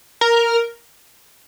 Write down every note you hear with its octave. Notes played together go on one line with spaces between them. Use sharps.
A#4